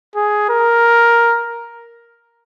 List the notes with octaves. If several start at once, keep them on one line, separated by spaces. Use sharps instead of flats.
G#4
A#4